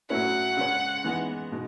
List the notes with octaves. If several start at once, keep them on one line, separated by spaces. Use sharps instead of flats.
A2 F#3 A3 C#4 E4 F#5
C#3 G#3 C#4
E3 G#3 B3 D#4
B2 G#3 D#4